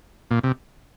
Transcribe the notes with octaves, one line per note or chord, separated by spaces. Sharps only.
A#2
C3